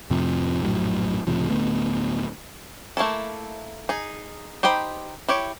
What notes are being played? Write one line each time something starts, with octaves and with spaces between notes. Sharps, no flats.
F2 A2 C3 F3
A#1 F#2 A2 F#3
C#2 A2 C3 F3
D1 D3 A3 B3
A3 A#3 E4 A4
D#4 G#4
D#4 G4 C5 G5 B5
E4 G4 C#5